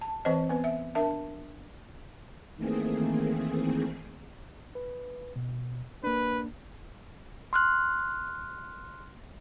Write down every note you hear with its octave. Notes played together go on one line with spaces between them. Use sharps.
A5
E3 C4 B4 C5 D#5
B3 B4
E5
D4 A#4 E5 A5
D#3 E3 A3 A#3 C4 G#4
B4
B2
A#3 D4 B4
C6 F6 F#6